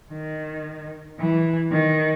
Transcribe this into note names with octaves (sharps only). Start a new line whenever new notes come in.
D#3
E3
D#3